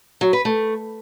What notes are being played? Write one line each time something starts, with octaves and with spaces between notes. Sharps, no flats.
F#3
B4
A3